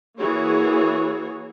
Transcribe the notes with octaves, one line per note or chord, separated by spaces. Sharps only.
E3 A#3 F#4 G#4 C#5